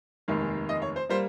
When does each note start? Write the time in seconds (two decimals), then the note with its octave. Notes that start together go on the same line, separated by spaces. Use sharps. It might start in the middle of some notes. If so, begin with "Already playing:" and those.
0.28 F1 D#2 D#3 G#3
0.69 D#5
0.82 C#5
0.96 C5
1.09 G3 A#3 C5